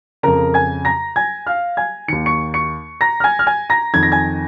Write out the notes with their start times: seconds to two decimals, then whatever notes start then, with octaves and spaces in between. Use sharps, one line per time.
0.23 F2 C#3 A#4 A#5
0.54 G#5 G#6
0.85 A#5 A#6
1.16 G#5 G#6
1.47 F5 F6
1.77 G#5 G#6
2.08 D#2 D#3 C#7
2.26 C#6 C#7
2.54 C#6 C#7
3.01 A#5 A#6
3.20 F6
3.24 G#5 G#6
3.39 F6
3.47 G#5 G#6
3.70 A#5 A#6
3.93 F2 D#3 G#6
4.03 A#6
4.12 G#5 G#6